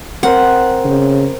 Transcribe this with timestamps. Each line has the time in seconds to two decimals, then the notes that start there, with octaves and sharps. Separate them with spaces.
0.23 C4 A#4 C5 F#5
0.85 C#3